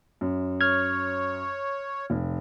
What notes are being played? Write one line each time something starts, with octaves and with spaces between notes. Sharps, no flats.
F#2
C#5 F6 G#6
F1